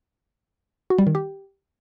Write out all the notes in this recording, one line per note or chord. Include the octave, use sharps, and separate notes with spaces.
F#4
G3
D#3
G4